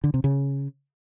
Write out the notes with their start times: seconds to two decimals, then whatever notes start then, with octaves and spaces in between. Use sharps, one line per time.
0.04 D3
0.14 C3
0.24 C#3